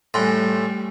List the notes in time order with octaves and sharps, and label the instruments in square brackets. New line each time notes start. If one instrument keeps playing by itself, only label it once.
[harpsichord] A2 [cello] G3 A3 [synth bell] G#5 C6